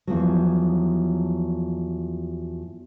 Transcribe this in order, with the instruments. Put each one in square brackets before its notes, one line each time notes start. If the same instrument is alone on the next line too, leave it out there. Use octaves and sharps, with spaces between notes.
[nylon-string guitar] E2 F3 F#3